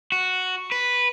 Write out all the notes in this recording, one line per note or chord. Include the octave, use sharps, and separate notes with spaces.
F#4
B4